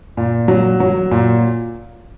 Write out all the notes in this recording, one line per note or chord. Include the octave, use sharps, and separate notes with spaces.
A#2
F#3
F#3
A#2